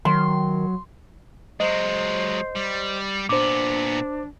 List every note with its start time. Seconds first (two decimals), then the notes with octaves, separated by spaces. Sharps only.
0.05 D#3 F#3 C6
1.60 F#3 G#3 C5 D#5
2.55 G3
3.29 A#2 B3 D4 C5 D6